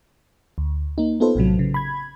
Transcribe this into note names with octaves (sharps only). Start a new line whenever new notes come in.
D2
A#3 D#4
B3 D#4 F4 A4 B4 C5
A#1 A2 C3 F#3
C#3
B5 G#6